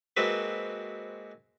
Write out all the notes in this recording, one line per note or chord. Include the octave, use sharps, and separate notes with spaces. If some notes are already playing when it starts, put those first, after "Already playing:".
G#3 A#3 C4 F#4 B4 E5